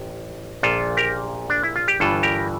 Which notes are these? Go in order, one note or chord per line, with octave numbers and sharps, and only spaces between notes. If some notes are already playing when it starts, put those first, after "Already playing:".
Already playing: A1 G4
A#1 A#2 F4 A4
G4 A#4
D4
E4
F4
G4
G1 G2 E3 F4 A4
G4 A#4